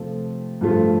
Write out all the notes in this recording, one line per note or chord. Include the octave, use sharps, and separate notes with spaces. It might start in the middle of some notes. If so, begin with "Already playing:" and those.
Already playing: C3 F3 A3 F4
G2 F3 A3 F4